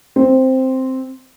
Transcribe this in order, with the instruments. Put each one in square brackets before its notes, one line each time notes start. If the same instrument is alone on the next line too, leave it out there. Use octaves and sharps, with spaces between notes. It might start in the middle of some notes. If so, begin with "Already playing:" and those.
[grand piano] C4